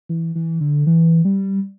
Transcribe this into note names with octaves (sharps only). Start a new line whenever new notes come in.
E3
E3
D3
E3
G3